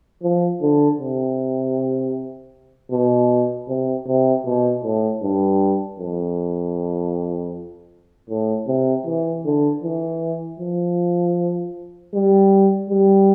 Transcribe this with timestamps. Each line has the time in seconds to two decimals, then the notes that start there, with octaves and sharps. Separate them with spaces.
0.23 F3
0.62 D3
0.99 C3
2.92 B2
3.69 C3
4.07 C3
4.45 B2
4.84 A2
5.22 G2
6.00 F2
8.30 A2
8.67 C3
9.06 E3
9.45 D3
9.84 E3
10.60 F3
12.14 G3
12.90 G3